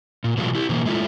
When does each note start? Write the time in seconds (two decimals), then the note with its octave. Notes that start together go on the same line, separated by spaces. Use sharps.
0.24 A#2
0.37 B2 E3 F#3 G#3 A3 F4
0.55 E4 G4
0.69 B2 E3 A#3
0.86 G#3 A3 E4 F4